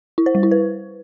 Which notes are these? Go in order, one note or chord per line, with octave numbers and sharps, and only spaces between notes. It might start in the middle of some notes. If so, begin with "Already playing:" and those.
E4
C5
G3
E4
B4